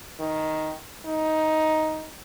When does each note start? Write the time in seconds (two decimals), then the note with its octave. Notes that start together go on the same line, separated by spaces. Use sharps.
0.20 D#3
1.06 D#4